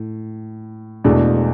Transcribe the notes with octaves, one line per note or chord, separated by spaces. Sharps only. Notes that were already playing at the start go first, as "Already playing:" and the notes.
Already playing: A2
E1 E2 B2 A3 D4